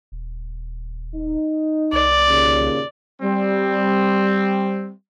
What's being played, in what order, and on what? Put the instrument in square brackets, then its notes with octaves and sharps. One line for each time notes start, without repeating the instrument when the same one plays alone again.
[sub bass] D#1
[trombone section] D#4
[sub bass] C2 [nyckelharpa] D5
[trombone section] D#2 A#2 C#3
[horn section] G3 C4